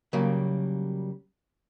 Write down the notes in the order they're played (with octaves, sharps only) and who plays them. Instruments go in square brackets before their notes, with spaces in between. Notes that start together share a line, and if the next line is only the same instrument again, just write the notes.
[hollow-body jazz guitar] C#3 F#3 G3 A#3